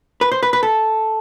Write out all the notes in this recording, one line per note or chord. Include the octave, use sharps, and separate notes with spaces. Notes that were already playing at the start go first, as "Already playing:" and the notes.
B4
C5
B4
B4
A4